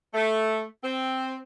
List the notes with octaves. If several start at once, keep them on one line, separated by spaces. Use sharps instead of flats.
A3
C4